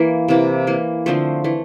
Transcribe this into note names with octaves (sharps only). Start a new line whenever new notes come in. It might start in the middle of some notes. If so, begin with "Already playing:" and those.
Already playing: E3 A#3
C3 E3 A#3
E3 A#3
D3 F3 A3 C4 C5
E3 A3